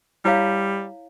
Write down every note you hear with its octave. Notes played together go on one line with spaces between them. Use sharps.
G3 E4 C#5 F5